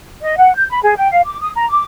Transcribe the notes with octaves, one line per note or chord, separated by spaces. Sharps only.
D#5
F#5
G6
B5
G#4
G5
F5
D6
D#6
A#5
D6